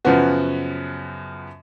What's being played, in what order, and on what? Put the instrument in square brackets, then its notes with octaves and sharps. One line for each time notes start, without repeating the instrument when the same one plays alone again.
[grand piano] F#2 C#3 F3 B3 F#4